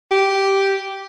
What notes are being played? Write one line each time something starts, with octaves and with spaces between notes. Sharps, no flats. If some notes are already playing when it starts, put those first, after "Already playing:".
G4